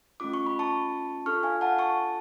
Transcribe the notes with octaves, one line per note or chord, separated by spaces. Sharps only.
A3 C#4 F4 D6
C#6
B5
A5 C#6
D4 F4 A4 C#6 F6
F5 G#5
F#5 A5
A5 C#6